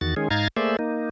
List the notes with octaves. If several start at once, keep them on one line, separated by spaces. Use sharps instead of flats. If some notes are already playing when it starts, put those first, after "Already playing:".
E2 D#3 F#4 A6
D#3 G#3 C#4 G#4
G#2 D#4 F5 A#5 G#6 A6
A3 A#3 G#4 C5 D5 E5
A#3 D#4